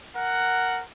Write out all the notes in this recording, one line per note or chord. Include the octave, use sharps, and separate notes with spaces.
A#4 F#5